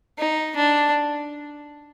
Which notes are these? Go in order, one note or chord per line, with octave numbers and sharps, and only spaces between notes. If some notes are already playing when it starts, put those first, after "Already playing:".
D#4
D4